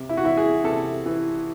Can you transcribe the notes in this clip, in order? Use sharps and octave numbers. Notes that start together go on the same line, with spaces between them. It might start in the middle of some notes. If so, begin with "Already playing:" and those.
Already playing: C3
E4
F#4
E3 E4
G#4
C3 A4
E3